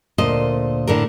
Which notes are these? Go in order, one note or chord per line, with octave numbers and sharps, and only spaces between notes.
D2 A#2 C5 D#5
A2 D3 A#4